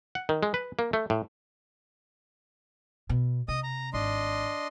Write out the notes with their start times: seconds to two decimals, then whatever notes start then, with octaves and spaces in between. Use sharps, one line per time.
0.15 F#5
0.29 D#3
0.43 G#3
0.54 B4
0.79 A#3
0.93 A3
1.10 A2
3.09 B2
3.48 C3 D#5 D#6
3.63 A#5
3.93 G#1 D4 D#5 C6